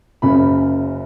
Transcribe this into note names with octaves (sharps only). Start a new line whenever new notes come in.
F#1 F#2 C#3 B5